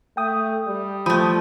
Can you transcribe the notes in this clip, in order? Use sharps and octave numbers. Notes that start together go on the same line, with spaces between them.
A3 G5 D#6
G3
F3 A3 B5 D#6 G6